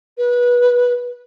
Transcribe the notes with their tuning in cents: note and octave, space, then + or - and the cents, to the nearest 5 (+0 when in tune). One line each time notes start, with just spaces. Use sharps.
B4 -20